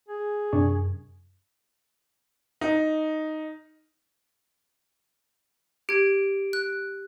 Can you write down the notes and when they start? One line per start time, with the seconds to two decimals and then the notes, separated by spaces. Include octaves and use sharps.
0.08 G#4
0.53 F#2 C3 D4 C#6
2.61 D#4
5.89 G4 G#6 D7
6.53 F#6